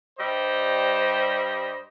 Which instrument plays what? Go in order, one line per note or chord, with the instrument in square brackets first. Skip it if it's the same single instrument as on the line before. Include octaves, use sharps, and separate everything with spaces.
[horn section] G2 G3 C5 D#5